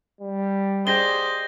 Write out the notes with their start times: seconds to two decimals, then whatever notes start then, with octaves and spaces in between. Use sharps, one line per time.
0.21 G3
0.87 G4 G#4 C5 D5 D#5 G6 A#6 G7